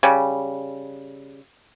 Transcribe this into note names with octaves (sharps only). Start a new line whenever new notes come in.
C#3 G3